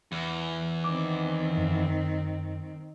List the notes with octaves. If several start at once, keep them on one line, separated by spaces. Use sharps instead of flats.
E2
D#3 C4 D6
F#2